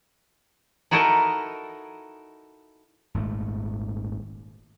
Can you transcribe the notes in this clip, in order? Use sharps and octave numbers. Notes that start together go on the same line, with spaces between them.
D#4 E4 F#4 A4 A#4 D#5
D#1 G#1 G#2 A3